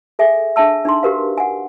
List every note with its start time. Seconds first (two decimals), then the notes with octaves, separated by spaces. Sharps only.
0.19 G#4 A4 E5 G#5
0.56 D4 G#4 E5 A5 E6
0.85 D4 D#4 C6
1.03 F#4 G4 A#4 B4 F5
1.38 F#5 G#5